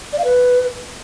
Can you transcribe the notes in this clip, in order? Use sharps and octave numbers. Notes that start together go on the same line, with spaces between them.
D5
F5
B4